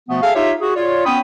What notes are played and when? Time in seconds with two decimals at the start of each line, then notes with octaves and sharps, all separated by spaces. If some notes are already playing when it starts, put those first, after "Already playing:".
0.09 B2 F3 A3 B3
0.23 G#4 A4 E5 F5
0.35 D#4 F4 G4 C#5 E5
0.61 F#4 G#4
0.76 F4 C#5 D5
1.05 B3 C#4 G5 B5 D#6